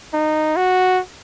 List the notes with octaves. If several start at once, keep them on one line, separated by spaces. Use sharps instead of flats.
D#4
F#4